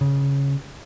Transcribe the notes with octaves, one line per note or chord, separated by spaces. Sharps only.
C#3